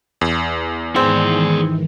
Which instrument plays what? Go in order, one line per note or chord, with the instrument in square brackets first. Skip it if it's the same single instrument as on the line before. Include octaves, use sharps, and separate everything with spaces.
[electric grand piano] E2
[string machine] G#2 D#3 E3 [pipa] C4 [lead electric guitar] G#4 D5